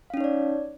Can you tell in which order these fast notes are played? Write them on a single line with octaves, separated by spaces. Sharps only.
F5 C#4 D#4 C#5 D5